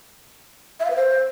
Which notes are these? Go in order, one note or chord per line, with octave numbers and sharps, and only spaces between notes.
E5
F5
B4
C5